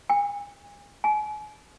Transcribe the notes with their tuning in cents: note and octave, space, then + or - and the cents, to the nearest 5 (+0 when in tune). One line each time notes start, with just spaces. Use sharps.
G#5 -35
G#5 +35